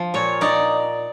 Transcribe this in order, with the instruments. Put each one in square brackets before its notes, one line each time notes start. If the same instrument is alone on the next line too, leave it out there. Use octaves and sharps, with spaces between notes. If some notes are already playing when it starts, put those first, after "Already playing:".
Already playing: [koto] F3
A#2 C#5
D#4 D5